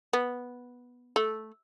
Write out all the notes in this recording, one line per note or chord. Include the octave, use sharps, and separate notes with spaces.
B3
A3